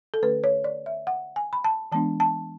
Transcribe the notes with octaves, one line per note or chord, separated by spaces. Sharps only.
A4
D3 A3 C#4 B4
C#5
D5
E5
F#5
G#5
B5
A5
E3 G#3 B3 D4 A5
A5